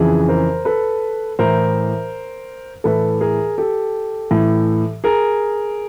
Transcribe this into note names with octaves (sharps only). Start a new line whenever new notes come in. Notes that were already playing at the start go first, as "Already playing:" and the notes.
Already playing: F2 C#3 E3 G#4
A#4 C5
A4 B4
A2 E3 A#4 C5
A2 E3 A4 B4
G#4 A#4
G4 A4
A2 E3
G#4 A#4